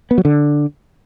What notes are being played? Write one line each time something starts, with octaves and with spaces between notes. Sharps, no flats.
B3
F#3
D3